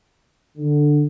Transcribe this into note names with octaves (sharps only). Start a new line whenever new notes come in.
D3